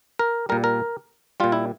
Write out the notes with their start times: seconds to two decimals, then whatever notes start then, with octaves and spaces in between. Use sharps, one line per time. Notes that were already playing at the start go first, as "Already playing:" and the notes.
0.19 A#4
0.49 A#2 G3 A#4
0.64 A#4
1.40 A#2 G3 F4
1.52 E4